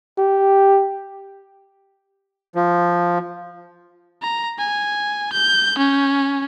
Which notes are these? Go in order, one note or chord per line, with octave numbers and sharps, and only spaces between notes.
G4
F3
A#5
G#5
G6
C#4